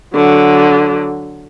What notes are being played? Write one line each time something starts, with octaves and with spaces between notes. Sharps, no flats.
D3 F#3